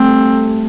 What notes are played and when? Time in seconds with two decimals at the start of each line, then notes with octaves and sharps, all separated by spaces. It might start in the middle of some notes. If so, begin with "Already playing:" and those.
Already playing: G3 A3 C4